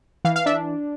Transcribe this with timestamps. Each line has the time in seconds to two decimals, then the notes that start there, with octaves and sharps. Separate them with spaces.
0.25 E3 F5
0.36 F5
0.46 D4 E5